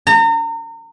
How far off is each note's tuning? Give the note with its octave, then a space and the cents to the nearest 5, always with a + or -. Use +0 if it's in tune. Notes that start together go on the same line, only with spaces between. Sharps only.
A#5 -35